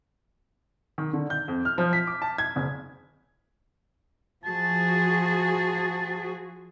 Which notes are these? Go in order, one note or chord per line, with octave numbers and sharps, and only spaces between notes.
D#3
D3
G6
F2
F6
F3
B6
D6
A5
G#6
F#1
F3 F#4 G#4 A5